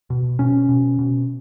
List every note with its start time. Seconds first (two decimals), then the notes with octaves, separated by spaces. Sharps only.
0.10 B2
0.39 B2 C#4
0.69 B2
0.99 B2